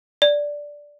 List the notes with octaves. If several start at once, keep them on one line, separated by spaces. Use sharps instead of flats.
D5